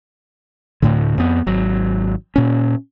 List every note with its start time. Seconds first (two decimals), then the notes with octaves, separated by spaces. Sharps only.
0.82 D2 A2 D3
1.18 F2 B3
1.47 G#1 F#3
2.36 A#2 C#4